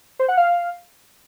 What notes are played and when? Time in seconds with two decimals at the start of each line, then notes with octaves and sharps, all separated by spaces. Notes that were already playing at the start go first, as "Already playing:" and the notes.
0.19 C5
0.28 F#5
0.37 F5